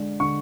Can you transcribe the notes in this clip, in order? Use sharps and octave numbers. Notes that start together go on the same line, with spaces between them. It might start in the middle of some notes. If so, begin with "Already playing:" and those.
Already playing: D3 G#3 D4
D3 C#6